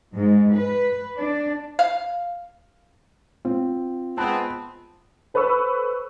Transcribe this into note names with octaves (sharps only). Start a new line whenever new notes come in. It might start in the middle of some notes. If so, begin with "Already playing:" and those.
G#2
B4
D4
F5
C4 F4
G#3 B3 C4 A5 B5 F#6
A4 B4 C5 B5 C#6 E6